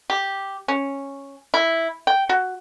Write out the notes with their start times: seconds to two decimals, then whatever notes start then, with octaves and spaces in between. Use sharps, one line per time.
0.10 G4
0.68 C#4
1.54 E4
2.07 G5
2.29 F#4